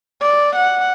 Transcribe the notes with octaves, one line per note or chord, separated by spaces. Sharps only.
D5
F#5